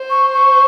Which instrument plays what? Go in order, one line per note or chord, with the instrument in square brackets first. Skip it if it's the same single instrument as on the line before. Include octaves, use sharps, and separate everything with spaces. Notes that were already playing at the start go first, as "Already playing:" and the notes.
Already playing: [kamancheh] C5
[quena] C#6
C#6